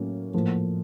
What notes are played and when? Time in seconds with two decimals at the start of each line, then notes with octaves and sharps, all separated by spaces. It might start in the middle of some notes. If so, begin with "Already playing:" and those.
Already playing: A2 F#3 A#3 C#4
0.34 A2 F3 A#3